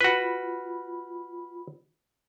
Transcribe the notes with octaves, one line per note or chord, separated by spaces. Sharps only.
F4 F#4 B4 B5